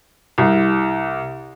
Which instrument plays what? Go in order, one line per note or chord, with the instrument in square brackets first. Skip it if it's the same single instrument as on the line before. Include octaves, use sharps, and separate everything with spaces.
[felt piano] C2